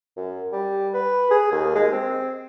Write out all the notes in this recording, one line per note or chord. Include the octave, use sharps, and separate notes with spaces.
F#2
G3
B4
G#4
D#2
G#3
C4